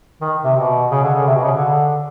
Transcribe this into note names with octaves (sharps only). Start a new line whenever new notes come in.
D#3
C3
B2
C#3
D3
C#3
C3
B2
C#3
D3